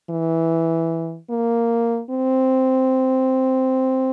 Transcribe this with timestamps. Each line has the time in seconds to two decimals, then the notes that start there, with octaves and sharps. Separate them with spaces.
0.10 E3
1.30 A#3
2.10 C4